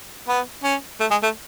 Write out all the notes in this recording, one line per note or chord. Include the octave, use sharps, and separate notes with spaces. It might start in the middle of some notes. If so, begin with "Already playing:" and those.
B3
C#4
A3
G#3
A3